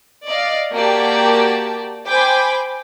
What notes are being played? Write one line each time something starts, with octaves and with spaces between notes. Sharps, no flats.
D5 D#5 F5
A#3 F#4 G4 D5 G5 A5
C5 G5 G#5 B5 D6